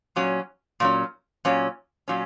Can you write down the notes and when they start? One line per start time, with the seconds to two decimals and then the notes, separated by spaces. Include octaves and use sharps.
0.16 A#2 F#3 C#4
0.80 A#2 F#3 C#4
1.45 A#2 F#3 C#4
2.08 A#2 F#3 C#4